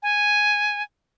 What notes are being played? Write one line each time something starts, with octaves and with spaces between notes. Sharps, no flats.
G#5